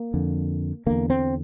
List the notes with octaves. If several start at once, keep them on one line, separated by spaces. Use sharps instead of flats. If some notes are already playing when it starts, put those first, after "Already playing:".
Already playing: A#3
F2 D3
E2 D3 A#3
C4